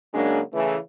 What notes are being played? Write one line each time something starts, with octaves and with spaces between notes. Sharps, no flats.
C#3 F#3 G#3 A#3 D4
C#3 E3 A3